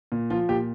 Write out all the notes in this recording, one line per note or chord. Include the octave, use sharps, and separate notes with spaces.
A#2
F3 F4
A#2 G4